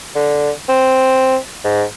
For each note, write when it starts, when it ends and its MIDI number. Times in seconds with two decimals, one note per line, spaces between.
0.15 0.51 50
0.69 1.36 60
1.64 1.84 44